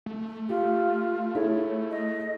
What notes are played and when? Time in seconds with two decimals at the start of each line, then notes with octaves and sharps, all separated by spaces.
0.06 A3
0.49 F4 G4
1.35 E4 G#4 A4 C#5
1.91 D#5